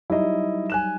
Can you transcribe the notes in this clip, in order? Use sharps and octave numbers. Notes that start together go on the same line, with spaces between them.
F#3 G3 D#4 E4 D#5
G#5 F#6 E7